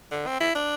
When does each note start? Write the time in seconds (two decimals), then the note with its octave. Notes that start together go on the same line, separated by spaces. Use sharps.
0.11 D3
0.27 C4
0.40 E4
0.55 D4